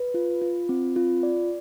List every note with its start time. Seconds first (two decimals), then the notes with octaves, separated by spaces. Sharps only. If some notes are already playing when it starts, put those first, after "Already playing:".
Already playing: B4
0.14 F4
0.42 F4
0.69 C4
0.96 F4
1.23 D5